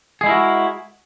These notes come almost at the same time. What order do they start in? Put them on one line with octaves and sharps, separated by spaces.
G#4 G#3 E4 A#4 F#4